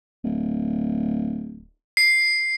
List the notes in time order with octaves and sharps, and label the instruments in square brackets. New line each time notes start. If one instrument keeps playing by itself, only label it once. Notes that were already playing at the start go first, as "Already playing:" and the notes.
[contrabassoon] D1
[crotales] C7